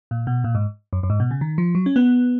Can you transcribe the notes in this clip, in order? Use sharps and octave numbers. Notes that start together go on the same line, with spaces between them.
A#2
B2
A#2
G#2
F#2
F#2
G#2
B2
C#3
D#3
F3
F#3
C#4
B3